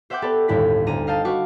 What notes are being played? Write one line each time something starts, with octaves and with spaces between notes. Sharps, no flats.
C5 E5 F#5 G5 D6 G6
B3 G4 A4 B4 D5
G1 D#2 A2 E4 B6
D2 A#5 D#7
D#5 F5 G5 A5
F#4 B4 F5 C#6 D6